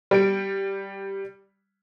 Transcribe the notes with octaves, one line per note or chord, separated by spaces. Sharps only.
G3 D7